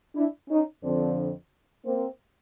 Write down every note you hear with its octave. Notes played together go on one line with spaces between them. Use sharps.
D4 E4
C#4 D#4
F2 D3 F3 C4 D4
A#3 C4